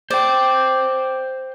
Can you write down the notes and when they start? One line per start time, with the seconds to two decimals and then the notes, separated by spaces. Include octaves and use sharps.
0.10 C5 D5 G5